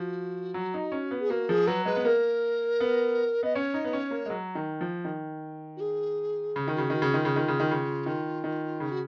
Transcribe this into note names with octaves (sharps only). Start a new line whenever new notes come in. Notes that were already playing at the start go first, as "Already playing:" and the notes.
Already playing: F3 F#4
F#3
D#4
C#4
B3
G#4
A#3 F#4
F3 G#4
F#3 B4
G#3 B4
B3
A#3 A#4
B3
B3 D#5
C#4 C#5
D#4
B3
C#4
A#3
G#3
F#3
D#3
F3
D#3
F#4
G#4
C#3
D#3
C#3 F#4
D#3 F#4
C#3
D#3 F4
C#3
D#3
C#3
D#3
C#3
D#3
D#3
C#3 D#4
F#4